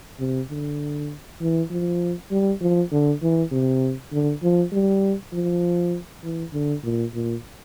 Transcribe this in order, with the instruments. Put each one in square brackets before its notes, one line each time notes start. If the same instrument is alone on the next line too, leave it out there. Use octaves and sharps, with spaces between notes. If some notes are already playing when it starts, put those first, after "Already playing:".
[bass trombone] C3
D3
E3
F3
G3
F3
D3
E3
C3
D3
F3
G3
F3
E3
D3
A#2
A#2